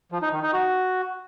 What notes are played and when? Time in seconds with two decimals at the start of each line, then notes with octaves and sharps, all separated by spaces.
0.12 F3
0.22 D#4
0.32 D#3
0.43 D#4
0.53 F#4